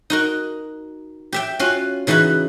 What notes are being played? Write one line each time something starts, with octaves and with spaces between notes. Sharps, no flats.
D#4 F#4 A#4
G4 E5 G5
C#4 F4 F#4 F5
C#3 E3 D#4 F#4 B5